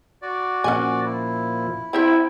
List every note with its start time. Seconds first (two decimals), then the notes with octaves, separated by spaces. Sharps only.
0.22 F#4 D5
0.64 A#2 F3 C#4 F#5 G#5
1.05 E4
1.93 C4 E4 C5 E5 G5